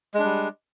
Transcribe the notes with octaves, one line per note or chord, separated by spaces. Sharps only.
G3 G#3 D4